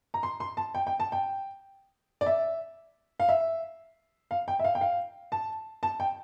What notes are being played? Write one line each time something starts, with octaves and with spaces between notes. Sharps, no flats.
A#5
C6
C6
A5
G5
G5
A5
G5
D5
E5
F5
E5
F5
G5
E5
F5
G5
F5
A5
A5
G5